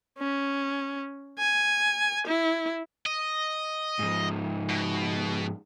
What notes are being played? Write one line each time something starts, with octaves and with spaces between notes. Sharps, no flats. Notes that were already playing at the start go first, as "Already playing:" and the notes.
C#4
G#5
E4
D#5
G#2 F3
B2